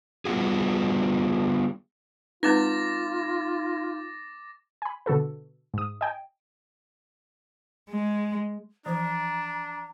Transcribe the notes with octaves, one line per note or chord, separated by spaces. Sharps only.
G3 B3 F4 F#4 G#4
G#3 C4 D#4 F4 B4 D6 A6 A#6
G#5 B5
B2 D3 F#4 A4 B4
G#2 D#6
D#5 G5 G#5
G#3
E3 F3 D4 C5 A#5